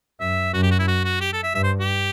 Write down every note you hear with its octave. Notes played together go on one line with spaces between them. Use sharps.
F#2 E5
F#2 F#4
G4
F#4
E4
F#4
F#4
G4
A4
E5
G2 E5
C5
G4